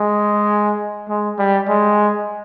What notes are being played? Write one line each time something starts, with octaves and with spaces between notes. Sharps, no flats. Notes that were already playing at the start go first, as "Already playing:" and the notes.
Already playing: G#3
G#3
G3
G#3